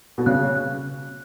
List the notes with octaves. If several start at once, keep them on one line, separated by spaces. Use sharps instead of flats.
B2
C#3 F#6
F#6